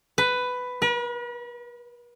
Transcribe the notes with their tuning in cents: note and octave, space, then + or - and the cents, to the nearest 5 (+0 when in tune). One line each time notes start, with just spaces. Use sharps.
B4 +10
B4 -45